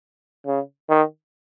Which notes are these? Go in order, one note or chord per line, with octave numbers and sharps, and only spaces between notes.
C#3
D#3